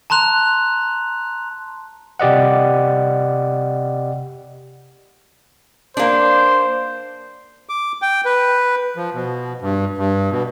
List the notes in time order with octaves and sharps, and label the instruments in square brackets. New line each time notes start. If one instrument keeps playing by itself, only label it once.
[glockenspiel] A5 A#5 C6 F#6 F7
[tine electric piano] C3 G4 D5 D#5 F#5
[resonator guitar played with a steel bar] A#3 D4 [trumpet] C5
[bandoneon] D6
G5
B4
F3
B2
G2
G2
B2